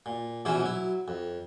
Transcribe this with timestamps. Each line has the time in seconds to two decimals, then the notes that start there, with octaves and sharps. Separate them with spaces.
0.06 A#2
0.45 A#1 B2 E3 C#4 E4 C5
0.63 F#3 E4
1.08 F2